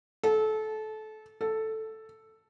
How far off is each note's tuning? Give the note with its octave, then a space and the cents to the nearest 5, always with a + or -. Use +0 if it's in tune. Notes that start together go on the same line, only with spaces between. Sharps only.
A4 -25
A4 +0